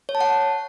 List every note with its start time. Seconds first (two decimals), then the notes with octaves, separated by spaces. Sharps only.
0.09 C#5
0.15 A5
0.21 F#5